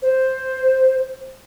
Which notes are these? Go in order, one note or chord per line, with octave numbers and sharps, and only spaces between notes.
C5